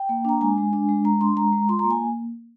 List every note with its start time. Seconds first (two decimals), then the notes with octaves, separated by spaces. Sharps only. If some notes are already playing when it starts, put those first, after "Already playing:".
Already playing: G5
0.09 A#3
0.25 D4 A#5
0.41 G#3 G#5
0.58 G#3
0.73 D4
0.89 G#3
1.05 G#3 A#5
1.21 D4 C6
1.37 G#3 A#5
1.52 G#3
1.69 F4 C6
1.79 A#5
1.84 A#3
1.91 G#5